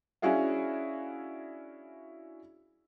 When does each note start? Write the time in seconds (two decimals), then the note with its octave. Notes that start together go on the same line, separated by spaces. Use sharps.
0.22 C#4 D4 E4 F#4 G#4 F5